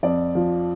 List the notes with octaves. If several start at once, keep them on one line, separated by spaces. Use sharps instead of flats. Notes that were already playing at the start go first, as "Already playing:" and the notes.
F2 D5
F3